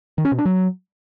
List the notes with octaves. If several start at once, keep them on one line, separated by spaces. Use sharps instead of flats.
D#3
C#4
B2
D4
F#3